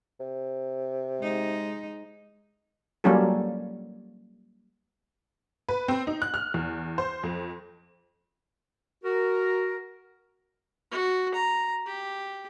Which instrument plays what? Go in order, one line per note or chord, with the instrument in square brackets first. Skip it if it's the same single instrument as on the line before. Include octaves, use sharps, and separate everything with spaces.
[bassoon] C3
[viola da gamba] G#3 D#4
[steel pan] F#3 G3 A#3 C#4 F4 A4
[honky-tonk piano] B4
C4
D#4
F#6
F6
E2
C5
F2
[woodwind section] F#4 A#4
[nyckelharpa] F#4
A#5
G4